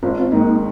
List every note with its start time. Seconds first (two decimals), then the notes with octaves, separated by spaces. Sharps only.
0.03 G#1 C4 F4
0.31 G#2 D#3 A#3 D#4